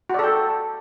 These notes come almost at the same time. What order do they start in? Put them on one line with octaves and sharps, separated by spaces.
F#4 D5 A4 G5